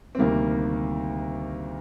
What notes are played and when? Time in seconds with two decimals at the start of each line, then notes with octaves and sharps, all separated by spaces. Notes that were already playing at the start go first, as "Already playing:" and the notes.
0.15 C4
0.18 D2 C3 D#3 G3 A#3